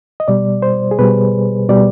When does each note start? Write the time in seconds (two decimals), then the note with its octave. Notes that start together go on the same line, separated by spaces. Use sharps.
0.20 D#5
0.28 B2 G3 D5
0.62 C5
0.91 G#4
0.99 B2 G3 B4
1.69 B2 G3 D5